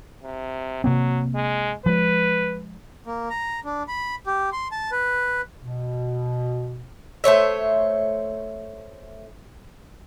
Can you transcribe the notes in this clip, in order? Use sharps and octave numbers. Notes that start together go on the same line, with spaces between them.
C3
C3 F#3 A#3 C4
G#3
F3 G#3 B4
A#3
A#5
D4
B5
G4
C6
A5
B4
B2
A3 C5 C#5 E5